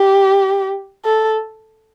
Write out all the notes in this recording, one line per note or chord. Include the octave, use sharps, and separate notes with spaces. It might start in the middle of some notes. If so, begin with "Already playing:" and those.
Already playing: G4
A4